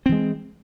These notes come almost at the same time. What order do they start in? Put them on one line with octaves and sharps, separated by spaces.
C4 E3 G#3